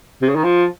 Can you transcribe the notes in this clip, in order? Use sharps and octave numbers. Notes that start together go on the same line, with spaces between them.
C3
C#3
D#3
F3